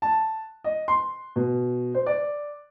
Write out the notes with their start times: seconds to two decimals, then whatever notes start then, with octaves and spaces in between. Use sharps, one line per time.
0.02 A5
0.64 D#5
0.88 C6
1.36 B2
1.94 C5
2.06 D5